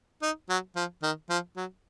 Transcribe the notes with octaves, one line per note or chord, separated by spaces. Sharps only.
D#4
F#3
F3
D#3
F3
F#3